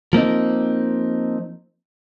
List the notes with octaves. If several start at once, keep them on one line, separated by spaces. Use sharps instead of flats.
F3 A#3 C4 D#4